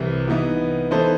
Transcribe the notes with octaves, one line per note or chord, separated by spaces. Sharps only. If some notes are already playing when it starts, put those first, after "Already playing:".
Already playing: C2 C3 E3
E3 B3 D#4
E3 B3 D#4 A4 C5